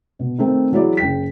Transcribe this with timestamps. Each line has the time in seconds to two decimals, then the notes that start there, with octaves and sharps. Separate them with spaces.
0.19 B2
0.38 D#3 A3 C4
0.72 E3 F#3 E4 G#4 D5
0.97 F#1 G5 B6